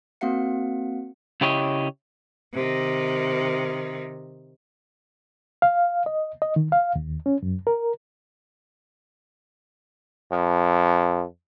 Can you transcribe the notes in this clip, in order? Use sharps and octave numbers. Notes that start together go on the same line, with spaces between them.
A#3 C4 F#4 F5 F#5 C#7
C#3 E4 G4 C#5 D#5
C3 D#3
F5
D#5
D#5
D#3
F5
D#2
C#4
F#2
A#4
F2